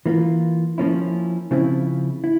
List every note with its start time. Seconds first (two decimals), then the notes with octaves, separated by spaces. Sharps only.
0.06 E3 A#3 F4
0.78 F3 A#3 C#4 E4
1.51 C#3 F3 C4 E4
2.24 E4